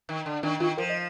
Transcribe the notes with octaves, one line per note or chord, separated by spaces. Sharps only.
D#3
D3
D#3 D4
D#3 F4
F3 A#4
D#5